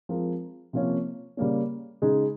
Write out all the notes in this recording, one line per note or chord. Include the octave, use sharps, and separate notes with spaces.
F3 G#3 C4 F4 A#4
C3 F3 A#3 C#4
C#3 G3 A#3 C#4
C#3 G#3 D#4 G#4